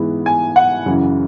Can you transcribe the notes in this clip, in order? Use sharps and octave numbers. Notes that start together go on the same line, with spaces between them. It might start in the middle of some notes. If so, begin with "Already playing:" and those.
Already playing: G#2 E3 G#3 B3 E4
G#5
F#5
F#2 C#3 E3